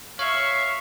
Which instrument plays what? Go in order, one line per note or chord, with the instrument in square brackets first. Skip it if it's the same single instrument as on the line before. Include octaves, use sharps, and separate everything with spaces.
[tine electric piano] C#5 [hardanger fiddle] E5 C#6 [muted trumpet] F5